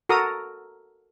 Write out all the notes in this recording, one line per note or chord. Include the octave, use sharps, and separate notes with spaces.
F#4 A4 A#4 A#5 D#6